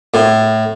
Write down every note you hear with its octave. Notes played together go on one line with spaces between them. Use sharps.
A2